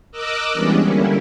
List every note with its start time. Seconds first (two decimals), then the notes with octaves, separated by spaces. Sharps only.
0.11 A#4 D#5 D6 E6 F#6
0.52 E3 G3 G#3 B3 C#4 D4
0.82 D3 G3 A#3 C#4 E4